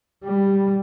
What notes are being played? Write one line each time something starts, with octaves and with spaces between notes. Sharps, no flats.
G3